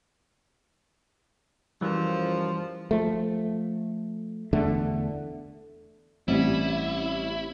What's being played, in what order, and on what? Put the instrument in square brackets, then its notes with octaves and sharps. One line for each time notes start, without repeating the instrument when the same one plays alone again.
[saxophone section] F#2 F3 [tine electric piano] E3 G3
[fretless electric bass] F3 A3
E2 D3 A3
[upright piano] A1 [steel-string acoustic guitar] G3 C#4 [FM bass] C4 [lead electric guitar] E4